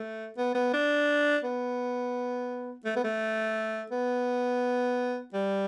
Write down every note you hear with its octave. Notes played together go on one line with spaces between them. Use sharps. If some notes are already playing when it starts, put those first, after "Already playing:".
Already playing: A3
B3
B3
D4
B3
A3
B3
A3
B3
G3